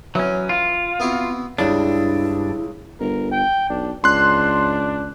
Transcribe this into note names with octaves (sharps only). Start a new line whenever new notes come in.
E3 F#3 C#4
F4
B3 C4 E4 F#4
C#2 G2 C#3 D4 E4
G1 A#4
G5
B1 D4
C#2 D4 C6 F#6